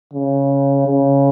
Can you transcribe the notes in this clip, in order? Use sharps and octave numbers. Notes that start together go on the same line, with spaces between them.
C#3
C#3